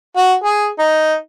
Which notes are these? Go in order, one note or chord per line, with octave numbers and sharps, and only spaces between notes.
F#4
G#4
D#4